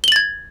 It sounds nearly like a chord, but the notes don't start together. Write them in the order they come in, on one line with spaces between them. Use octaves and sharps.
G7 F#7 A6 G#6